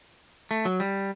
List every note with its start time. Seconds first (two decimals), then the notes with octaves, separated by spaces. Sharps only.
0.51 A3
0.65 F#3
0.80 G3